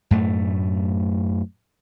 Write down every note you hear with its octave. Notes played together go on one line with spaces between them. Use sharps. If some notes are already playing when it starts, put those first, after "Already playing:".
F#2 A2 A3